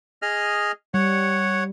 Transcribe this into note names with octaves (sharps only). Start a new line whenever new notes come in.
G#4 D#5 F6
G3 C#5 F#5